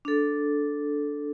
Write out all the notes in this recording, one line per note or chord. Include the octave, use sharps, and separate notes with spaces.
D4 A4